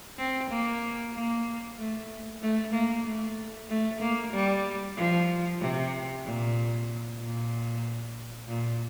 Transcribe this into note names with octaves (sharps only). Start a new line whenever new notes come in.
C4
A#3
A#3
A3
A3
A#3
A3
A3
A#3
G3
F3
C3
A#2
A#2
A#2